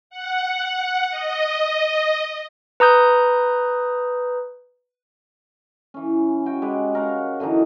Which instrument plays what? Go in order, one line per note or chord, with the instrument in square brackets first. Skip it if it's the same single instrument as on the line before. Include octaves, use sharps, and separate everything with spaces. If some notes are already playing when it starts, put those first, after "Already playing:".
[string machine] F#5
D#5
[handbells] B4 A#5 D#6 G6
[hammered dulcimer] E3 C#4
F#4 G5 G#5
G#3 G4 B4
A#4 C#5 F5 F#5
D3 E3 F#3 D#4